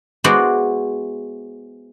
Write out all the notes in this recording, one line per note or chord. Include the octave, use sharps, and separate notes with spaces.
G#3 B3 E4 F#4 C5 D5